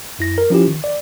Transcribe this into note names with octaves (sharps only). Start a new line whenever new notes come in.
F#2 E4 A#6
A#4
F3 C#4 E4 F4 G4
D#3
D5